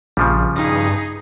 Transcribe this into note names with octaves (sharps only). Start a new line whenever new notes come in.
A#1 C#3 F3 G3
G2 D#4 G#4